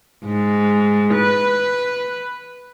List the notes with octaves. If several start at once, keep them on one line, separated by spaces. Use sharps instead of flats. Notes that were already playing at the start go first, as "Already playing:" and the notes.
G#2
B4